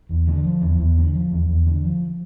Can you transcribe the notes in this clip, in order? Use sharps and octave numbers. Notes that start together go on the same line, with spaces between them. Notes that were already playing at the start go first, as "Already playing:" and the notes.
E2
D3
F3
E2
E2
D3
F3
E2
E2
D3
F3